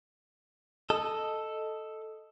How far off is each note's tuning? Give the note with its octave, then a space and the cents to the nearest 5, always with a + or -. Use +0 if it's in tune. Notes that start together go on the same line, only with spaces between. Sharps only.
A4 +0 D#5 +0